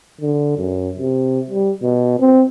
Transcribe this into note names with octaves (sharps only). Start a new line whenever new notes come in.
D3
F#2
C3
G3
B2
C4